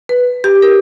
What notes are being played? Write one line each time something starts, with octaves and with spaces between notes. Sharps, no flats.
B4
G4
A#4